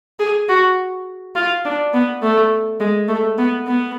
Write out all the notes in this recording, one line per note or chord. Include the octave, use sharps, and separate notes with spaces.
G#4
F#4
F4
D4
B3
A3
G#3
A3
B3
B3